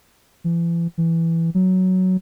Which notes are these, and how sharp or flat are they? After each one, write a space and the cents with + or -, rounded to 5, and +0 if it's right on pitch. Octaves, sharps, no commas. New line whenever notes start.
E3 +40
E3 +5
F#3 +5